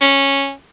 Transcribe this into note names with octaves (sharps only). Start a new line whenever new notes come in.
C#4